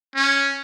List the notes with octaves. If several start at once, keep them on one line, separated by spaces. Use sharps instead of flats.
C#4